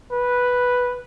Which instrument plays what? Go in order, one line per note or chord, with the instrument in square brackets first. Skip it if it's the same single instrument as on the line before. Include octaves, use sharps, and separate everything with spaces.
[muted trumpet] B4